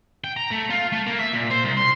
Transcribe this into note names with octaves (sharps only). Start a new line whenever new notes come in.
G5
A#5
A3
F4
A3
A#3
E5
A#2
C5
C2
C6